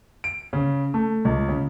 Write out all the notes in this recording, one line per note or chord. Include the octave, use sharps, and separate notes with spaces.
D7
C#3
A3
C#2
C#3